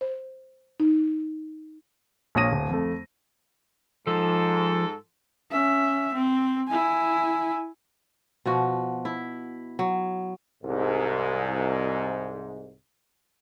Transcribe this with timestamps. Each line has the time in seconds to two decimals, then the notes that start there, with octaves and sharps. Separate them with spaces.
0.01 C5
0.80 D#4
2.35 A#1 A#2 C#5 D#6 A#6 D#7
2.52 D1
2.69 F2 A3
4.07 G#2 F3 A4
5.51 C#4 E5
6.14 C4
6.68 E4 G#5
8.46 B2 F3 F#4
9.05 E4
9.79 F#3
10.62 C2 G#2